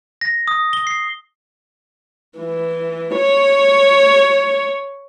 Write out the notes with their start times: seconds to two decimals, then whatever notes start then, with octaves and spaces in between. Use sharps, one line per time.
0.21 A#6
0.48 D#6
0.73 G7
0.87 C7
2.39 E3
3.17 C#5